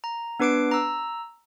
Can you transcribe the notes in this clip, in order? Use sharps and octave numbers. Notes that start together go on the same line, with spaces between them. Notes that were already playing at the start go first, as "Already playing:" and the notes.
A#5
B3 D4 B4 D6 C7 D7
A#5 E6